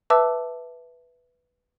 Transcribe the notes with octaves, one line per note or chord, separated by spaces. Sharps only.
B4 E5 A5 D6 E6